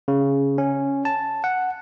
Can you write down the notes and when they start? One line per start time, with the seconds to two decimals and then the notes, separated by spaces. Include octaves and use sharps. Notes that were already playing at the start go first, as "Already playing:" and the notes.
0.08 C#3
0.58 C#4
1.05 A5
1.44 F#5